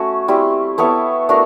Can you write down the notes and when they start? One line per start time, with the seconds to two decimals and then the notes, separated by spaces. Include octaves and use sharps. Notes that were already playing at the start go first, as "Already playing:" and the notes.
Already playing: A3 C#4 F#4
0.28 G3 C4 E4
0.78 B3 E4 A4 C#5
1.29 A3 D4 F#4 A#4